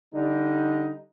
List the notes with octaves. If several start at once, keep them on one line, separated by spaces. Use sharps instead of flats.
D3 G3 D#4